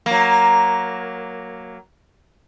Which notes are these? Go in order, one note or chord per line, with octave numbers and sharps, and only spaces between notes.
F#3 A#3